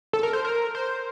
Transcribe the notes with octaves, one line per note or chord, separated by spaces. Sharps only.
A4
A#4
C5
A#4
C5